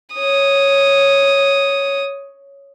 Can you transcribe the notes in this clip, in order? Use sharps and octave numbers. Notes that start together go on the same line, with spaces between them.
C#5 D#6